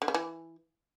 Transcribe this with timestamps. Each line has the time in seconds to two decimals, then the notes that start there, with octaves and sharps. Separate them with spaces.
0.02 D3
0.08 C#3
0.14 E3